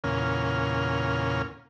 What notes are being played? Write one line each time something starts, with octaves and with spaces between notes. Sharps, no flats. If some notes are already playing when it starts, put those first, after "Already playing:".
E2 A#2 C#3 C#4 A#4 F6